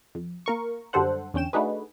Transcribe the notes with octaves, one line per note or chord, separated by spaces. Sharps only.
F2
A#3 A#4 C#6
F#2 D3 G3 A4 C5 F#5
E2 D3 C#4 G5 E7
A3 D4 D#4 F#4 G#4 B4